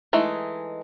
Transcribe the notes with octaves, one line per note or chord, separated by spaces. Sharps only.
E3 G#3 A3 D#4